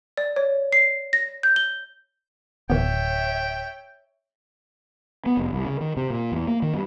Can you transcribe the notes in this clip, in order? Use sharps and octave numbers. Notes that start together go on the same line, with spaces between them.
D5
C#5
C7
A#6
G6
G7
D1 D#3 E3 B3 C#5 E5 G5
B3
F1
C2
C#3
D#3
C3
A#2
E2
A#3
D#3
G2